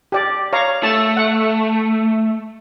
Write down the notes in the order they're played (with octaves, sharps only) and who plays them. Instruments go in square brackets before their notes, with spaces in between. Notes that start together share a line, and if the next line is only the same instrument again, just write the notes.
[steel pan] G4 D5
C#5 F5 A#5
[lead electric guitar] A3 [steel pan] A5
[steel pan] F#5